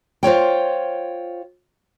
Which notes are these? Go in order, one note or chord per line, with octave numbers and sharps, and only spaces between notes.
F4 C5 C#5 G5